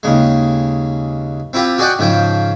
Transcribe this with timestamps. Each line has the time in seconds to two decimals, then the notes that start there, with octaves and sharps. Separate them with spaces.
0.03 D#2 C#3 G#3
1.53 C4 E4 F4 G4
1.78 F#4 G#4 D5 D#5 F#5 G5
1.99 G#2 C#3 F3 G5